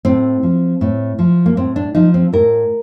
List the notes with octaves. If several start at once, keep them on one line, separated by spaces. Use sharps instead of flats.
A2 C4
F3
A2
F3
A#3
A2 C4
D4
F3 D#4
C4
A2 A#4